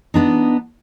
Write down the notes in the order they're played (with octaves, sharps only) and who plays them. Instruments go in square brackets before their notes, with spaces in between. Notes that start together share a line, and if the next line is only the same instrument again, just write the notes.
[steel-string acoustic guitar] B3 D4 D#4